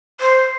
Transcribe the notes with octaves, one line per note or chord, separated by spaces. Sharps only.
C5